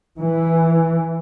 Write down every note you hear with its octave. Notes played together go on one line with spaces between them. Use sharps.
E3